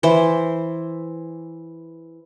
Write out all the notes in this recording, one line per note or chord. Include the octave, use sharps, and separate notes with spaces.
E3 C5